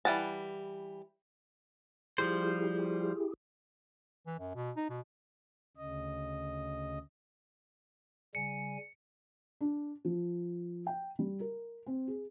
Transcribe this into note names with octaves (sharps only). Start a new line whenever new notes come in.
E3 G3 F#5 A5
F3 G3 E4 G4 G#4 C5
E3
F#2
B2
D#4
B2
D2 C#3 D#5
C#3 G3 G#5 C#7
D4
F3
G5
G3
A#4
C4
G#4